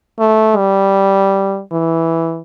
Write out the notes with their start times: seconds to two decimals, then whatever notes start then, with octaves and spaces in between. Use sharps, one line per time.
0.20 A3
0.57 G3
1.72 E3